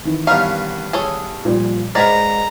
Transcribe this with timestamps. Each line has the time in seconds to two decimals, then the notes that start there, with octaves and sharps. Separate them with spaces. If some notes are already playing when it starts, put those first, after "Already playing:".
0.05 D#3 E3
0.27 G2 B3 C#4 A#4 F5
0.93 G#4 A4 C#5
1.45 A#2 F3 G3
1.95 G#2 A#4 B4 D5 A#5 G#6 B6